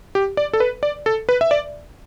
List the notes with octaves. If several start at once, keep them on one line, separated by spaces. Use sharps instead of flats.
G4
D5
A4
B4
D5
A4
B4
E5
D5